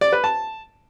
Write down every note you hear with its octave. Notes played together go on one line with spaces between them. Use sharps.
D5
B4
A5